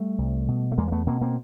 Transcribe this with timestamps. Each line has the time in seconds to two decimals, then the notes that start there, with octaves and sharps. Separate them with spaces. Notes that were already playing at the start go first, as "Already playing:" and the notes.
Already playing: G3 A3
0.18 C2
0.48 B2
0.72 A3
0.78 E2 G#3 A#3
0.88 A#3
0.92 A3 B3
1.07 B2 A#3 C4
1.21 A#3 C4